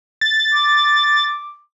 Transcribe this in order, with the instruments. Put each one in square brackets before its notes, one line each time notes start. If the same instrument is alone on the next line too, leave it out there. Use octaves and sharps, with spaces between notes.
[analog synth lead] A6
[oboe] D6